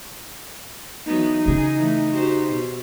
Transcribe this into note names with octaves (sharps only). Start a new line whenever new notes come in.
E3 F#3 B3 D#4
C#3 C#4 G#4
E3 A3
F#4 G4 C5
B2